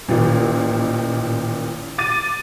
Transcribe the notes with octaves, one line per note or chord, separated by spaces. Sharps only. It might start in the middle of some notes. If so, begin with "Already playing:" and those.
A1 A#2 D#3
D6 A6 D#7